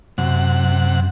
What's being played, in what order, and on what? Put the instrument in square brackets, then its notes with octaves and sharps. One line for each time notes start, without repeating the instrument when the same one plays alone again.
[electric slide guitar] F#2 [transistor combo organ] C3 F#5